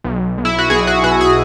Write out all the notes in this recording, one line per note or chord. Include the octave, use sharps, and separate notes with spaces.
B1
B1
E4
F#4
B1 G#4
F#4
B2 F#4
G#4